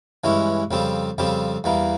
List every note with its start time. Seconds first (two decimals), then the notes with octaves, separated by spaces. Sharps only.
0.24 G2 E3 G#3 C#4 E4
0.71 F2 C#3 G3 C4 G4
1.18 F2 C#3 G3 C4 G4
1.64 E2 E3 G3 A#3